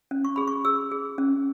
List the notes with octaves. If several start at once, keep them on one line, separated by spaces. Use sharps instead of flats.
C#4
C#6
G#4 B5
C#6
G#4 E6
G#4
C#4